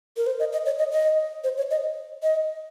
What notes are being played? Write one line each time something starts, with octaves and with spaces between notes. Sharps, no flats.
A#4
C5
D#5
D#5
C#5
D#5
D#5
C5
C#5
D#5
D#5